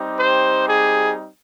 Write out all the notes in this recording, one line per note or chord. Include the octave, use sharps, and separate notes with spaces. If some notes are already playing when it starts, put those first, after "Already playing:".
Already playing: G3 C4 D#4 G4
C5
G#4